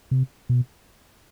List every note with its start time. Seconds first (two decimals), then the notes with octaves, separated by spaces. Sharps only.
0.11 C3
0.49 B2